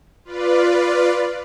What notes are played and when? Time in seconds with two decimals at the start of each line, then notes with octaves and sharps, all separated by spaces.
0.24 F4 B4 D5